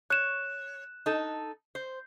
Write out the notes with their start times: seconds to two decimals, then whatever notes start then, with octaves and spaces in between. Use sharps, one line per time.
0.10 C#5 F#6 E7
1.06 D#4 A4
1.75 C5